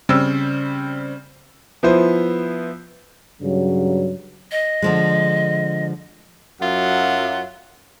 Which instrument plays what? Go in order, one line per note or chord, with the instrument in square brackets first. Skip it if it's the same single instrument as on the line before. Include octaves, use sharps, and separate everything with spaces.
[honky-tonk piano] C#3 G3 C4 E6
[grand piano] F3 B3 E4 C5
[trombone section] G2 C#3 F#3
[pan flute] D#5
[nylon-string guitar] D3 F3 G#3
[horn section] F#2 F#3 F4 E5 F#5